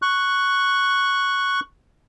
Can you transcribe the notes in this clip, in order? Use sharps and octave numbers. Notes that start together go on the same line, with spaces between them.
C#6 F#6